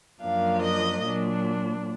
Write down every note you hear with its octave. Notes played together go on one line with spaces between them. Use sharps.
F#2 F3 A#3 D4 F5
D#5
A#2 F#3 D4